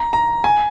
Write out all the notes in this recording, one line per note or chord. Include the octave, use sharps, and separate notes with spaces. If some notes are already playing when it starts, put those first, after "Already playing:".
Already playing: A#5
A#5
G#5